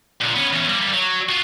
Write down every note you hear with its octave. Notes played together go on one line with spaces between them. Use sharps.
A#2 D3
B3 C#4
E2 C#4
G3 A#3
F#3
F4 F#4